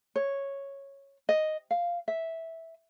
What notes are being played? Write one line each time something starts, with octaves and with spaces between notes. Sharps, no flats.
C#5
D#5
F5
E5